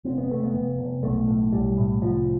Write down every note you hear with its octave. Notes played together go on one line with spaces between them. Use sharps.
F1 C4
B3
F1 A3
B3
F1
F1
B1 A3
A2
B1 G3
A2
C2 F3